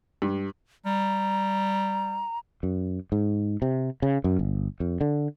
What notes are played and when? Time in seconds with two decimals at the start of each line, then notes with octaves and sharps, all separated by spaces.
0.22 G2
0.86 G3 A#5
2.63 F#2
3.12 G#2
3.62 C3
4.02 C#3
4.24 F#2
4.39 G1
4.80 F2
5.01 D3